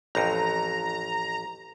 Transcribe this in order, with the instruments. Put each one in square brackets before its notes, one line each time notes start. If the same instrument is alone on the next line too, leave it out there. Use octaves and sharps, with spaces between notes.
[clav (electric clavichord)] A1 F2 [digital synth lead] A#5